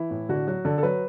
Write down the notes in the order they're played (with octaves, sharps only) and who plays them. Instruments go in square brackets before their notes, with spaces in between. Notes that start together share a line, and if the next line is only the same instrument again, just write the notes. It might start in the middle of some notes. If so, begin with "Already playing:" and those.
Already playing: [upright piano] E3 E4
A2
D3 F#4
F#3 F#4
D3 A4
A4
F#3 B4